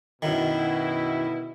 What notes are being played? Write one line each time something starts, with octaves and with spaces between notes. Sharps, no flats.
F#2 B2 D#3 E4